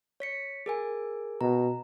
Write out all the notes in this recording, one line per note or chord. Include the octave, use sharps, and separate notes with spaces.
C#5 B6 C#7
G#4 A#4 G#5
B2 A#5